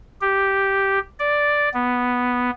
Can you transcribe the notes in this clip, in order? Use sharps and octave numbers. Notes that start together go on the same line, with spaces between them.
G4
D5
B3